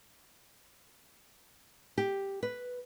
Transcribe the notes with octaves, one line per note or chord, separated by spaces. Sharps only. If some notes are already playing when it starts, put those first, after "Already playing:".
G4
B4